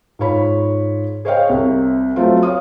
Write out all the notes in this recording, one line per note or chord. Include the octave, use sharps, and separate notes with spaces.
G#2 F4 C#5 B5
G#4 C5 C#5 D#5 F5 G5
C2 C3
F#3 A3 C4 F4
C#5 F5 D#6